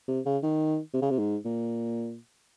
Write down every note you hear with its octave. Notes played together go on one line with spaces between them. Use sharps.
C3
C#3
D#3
C3
C#3
C3
G#2
A#2